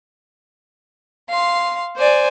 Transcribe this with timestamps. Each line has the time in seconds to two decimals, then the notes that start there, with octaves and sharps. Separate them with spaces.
1.30 F5 C6
1.96 C5 D5 G#5